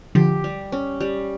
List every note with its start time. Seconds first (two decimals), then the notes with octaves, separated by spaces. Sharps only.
0.15 D3 F3 G4
0.44 G3
0.72 C#4
1.00 G3